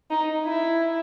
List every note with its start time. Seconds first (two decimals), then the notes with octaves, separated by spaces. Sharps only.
0.10 D#4
0.45 E4